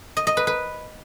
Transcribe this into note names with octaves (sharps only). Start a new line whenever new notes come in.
D#5
D#5
B4
B4